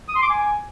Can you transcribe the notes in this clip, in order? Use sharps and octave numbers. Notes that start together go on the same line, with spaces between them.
D#6
C6
D6
G#5